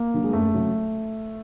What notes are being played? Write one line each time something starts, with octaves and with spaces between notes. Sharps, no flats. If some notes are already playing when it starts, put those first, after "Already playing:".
Already playing: A#3
D3 F#3
G#3
F#2 A3
C#3 F#3